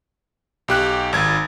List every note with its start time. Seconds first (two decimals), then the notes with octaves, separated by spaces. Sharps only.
0.68 B1 G4 F#6
1.13 G#1 G#6